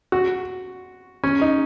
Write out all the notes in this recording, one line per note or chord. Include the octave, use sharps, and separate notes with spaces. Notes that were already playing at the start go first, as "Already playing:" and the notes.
F#4
C#4
D#4